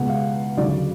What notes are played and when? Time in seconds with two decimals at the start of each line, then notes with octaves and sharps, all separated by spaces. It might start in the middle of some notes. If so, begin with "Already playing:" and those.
Already playing: C#2 B2 G#3 F#5
0.09 F5
0.57 D2 C#3 F#3 D5